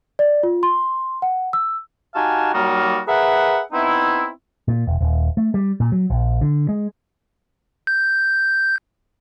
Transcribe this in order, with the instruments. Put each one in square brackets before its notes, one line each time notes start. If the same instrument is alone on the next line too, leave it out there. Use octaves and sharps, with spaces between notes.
[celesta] D5
F4
C6
F#5
E6
[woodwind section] D#4 F#4 G4 F5 G#5 A5
F#3 G3 A#3 D#4 F4 F#4
G#4 A#4 B4 E5 F#5
B3 C4 D#4 E4
[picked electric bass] A#2
E1
D#1
A3
G3
A#2
F#3
A#1
D3
G#3
[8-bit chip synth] G6